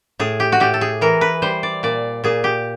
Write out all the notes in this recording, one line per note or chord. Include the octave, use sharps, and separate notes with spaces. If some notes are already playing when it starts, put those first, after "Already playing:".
A2 G#4
G4
F#4
A2 G4
A4
G#4
E3 A#4
B4
G3 C5
D5
A#2 D5
A#2 G#4
G4